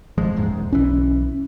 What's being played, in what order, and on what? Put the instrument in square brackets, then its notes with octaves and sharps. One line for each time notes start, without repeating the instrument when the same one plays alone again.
[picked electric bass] G#1 F3 G#3
D#1 E2 G#2
[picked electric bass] B1 E3 [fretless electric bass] C#4